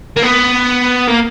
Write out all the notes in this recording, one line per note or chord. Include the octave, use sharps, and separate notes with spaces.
A#3
B3
A#3